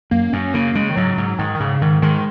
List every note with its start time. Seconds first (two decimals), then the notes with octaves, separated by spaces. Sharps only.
0.11 F#2 A#3
0.33 F#2 C#4
0.54 C#3 A#3
0.75 C#3 G#3
0.90 D#3
0.96 G#2 F#3
1.18 G#2
1.39 G#2 D#3
1.55 D#3
1.60 G#2 C#3
1.81 G#2 D#3
2.02 D#3 G#3